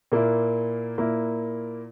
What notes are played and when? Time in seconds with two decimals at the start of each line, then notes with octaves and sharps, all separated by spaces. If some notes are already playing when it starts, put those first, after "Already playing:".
0.12 A#2 A#3 E4
0.98 A#2 A#3 E4